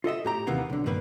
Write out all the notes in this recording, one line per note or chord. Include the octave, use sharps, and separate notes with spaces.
F4 A4 D#5 E5
A2 G4 A#5
D#2 C3 D#3 E3 A#3 B3
B1 D3
G2 D#3 A#3 B4